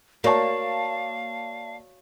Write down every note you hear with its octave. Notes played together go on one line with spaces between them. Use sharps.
A#3 F#4 C#5 D5 F5 A5 C#6